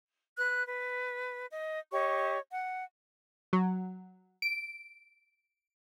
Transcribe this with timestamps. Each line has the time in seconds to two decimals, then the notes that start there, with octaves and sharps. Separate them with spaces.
0.38 B4 F#6
0.66 B4
1.52 D#5
1.92 G4 C#5 D#5 C#6
2.51 F#5
3.53 F#3
4.42 D7